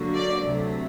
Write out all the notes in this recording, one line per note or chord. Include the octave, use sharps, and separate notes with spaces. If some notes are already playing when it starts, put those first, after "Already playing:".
Already playing: D3 F#3 A#3 F#4
D5
D2 C3 F#3 A3